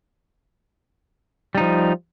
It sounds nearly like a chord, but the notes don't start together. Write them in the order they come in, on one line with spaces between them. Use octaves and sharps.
G3 D#4 F3